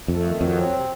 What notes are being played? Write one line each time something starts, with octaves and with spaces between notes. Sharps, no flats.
F2 A3
D#3
F2 F#3
C4
C3